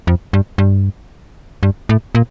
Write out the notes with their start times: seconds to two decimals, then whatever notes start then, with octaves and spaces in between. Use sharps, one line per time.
0.07 F2
0.33 G2
0.58 G2
1.63 G2
1.89 A2
2.15 A#2